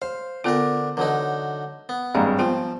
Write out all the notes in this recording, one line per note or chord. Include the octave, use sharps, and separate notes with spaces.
C5 F5
D3 B3 D4 F4 A#4
D3 E3 F#3 D#4
B3
G#1 G2 F5 G5 A#5
F3 B3 F4 C5 G5